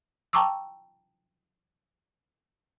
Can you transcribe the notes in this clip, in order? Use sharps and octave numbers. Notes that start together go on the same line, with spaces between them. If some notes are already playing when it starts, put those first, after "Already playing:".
G5 A5 A#5 C#6 D6 E6